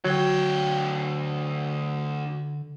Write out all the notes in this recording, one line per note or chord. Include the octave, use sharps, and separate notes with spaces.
D2 D3 F#3 G5